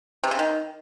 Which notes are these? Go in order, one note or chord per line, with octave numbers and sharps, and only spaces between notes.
C3
C#3
D#3